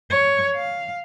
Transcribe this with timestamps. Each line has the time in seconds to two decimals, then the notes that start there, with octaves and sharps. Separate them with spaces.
0.10 C#5
0.55 F5